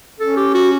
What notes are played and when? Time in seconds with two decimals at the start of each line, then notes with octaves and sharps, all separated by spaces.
0.20 C#4 A4
0.37 G4
0.54 F#4